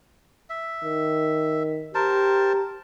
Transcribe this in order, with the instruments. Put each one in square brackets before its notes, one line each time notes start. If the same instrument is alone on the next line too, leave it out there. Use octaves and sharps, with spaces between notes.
[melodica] E5
[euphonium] D#3
[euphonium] G4 [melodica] A#4 C5 A5